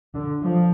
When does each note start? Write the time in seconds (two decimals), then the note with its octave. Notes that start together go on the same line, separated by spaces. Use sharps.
0.14 D3
0.43 F3